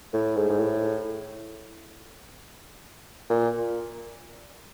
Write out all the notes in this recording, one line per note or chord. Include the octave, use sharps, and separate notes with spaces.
A2
G#2
G#2
A2
A#2